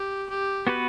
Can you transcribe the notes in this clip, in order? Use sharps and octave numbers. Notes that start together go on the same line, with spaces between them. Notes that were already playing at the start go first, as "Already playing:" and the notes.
Already playing: G4
G4
B3 F#4 B4